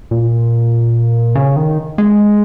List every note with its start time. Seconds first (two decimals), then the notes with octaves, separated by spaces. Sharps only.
0.11 A#2
1.35 C#3
1.56 D#3
1.98 G#3